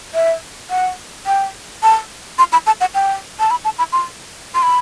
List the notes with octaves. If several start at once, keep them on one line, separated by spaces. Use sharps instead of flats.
E5
F#5
G5
A5
C6
B5
A5
F#5
G5
A5
B5
A5
B5
C6
C6
B5